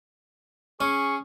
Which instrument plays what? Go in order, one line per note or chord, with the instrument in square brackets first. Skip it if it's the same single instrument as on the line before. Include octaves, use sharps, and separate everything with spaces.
[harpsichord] C#4 [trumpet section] G#4 C#6